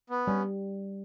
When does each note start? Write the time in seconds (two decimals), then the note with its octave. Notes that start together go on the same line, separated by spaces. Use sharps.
0.10 B3
0.27 G3 C#4